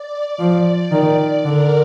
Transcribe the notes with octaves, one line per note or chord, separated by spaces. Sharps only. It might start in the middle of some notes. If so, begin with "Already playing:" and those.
Already playing: D5
F3
D#3
D3 A#4